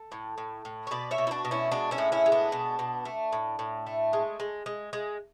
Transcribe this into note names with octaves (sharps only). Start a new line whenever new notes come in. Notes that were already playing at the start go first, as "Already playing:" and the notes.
Already playing: A4
A2
A2
A2
C#5
B2 B4 D5
C#5 E5
B2
E4
D4 F#4
B2
C#4 E4
G#3 D4 F#4
C#4 E4
A2
C#4 E4
G#3
B3 D4
B2
B2
A3
A2
A2
A3
G#3
G#3
G#3
G#3